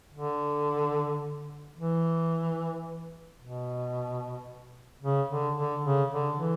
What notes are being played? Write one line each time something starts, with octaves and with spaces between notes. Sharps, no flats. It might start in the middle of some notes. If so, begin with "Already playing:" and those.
D3
E3
B2
C#3
D3
D3
C#3
D3
E3